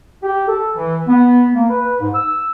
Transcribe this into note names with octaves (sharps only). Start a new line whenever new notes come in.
G4
A4
E3
B3
A#3
B4
G#2
E6